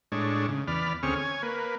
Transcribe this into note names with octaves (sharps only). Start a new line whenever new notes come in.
A2 G#3 D4 C#5
C#3
E2 D5 B5 F6
D2 C4 C#4 G#4 C#6 F6
C#5 G#5
A#3 B4